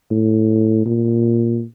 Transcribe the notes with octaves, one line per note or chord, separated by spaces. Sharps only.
A2
A#2